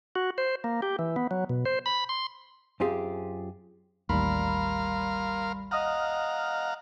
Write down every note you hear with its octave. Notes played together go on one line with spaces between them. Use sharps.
F#4
C5
A#3
G4
E3
B3
F#3
B2
C5
B5
C6
F#2 C4 F4 G4 G#4
A1 D#2 G3 A#4 F5 B5 C6
D#5 F5 F#5 A#5 D#6 F6